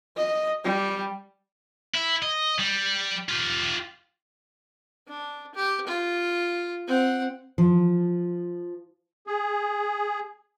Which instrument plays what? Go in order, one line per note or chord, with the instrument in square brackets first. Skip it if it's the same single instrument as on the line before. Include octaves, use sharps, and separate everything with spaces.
[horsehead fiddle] D#5
G3
[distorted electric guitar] E4
D#5
G3
F4 G4
[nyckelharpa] D4
G4
F4
C4 F#5
[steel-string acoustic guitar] F3
[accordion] G#4